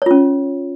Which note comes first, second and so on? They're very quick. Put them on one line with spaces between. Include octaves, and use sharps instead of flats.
C#5 F4 C#4